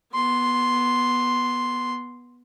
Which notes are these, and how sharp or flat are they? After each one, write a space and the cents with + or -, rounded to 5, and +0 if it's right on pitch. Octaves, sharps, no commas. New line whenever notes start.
B3 -15 C6 +0